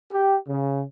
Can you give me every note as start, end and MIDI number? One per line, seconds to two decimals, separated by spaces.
0.12 0.37 67
0.48 0.82 49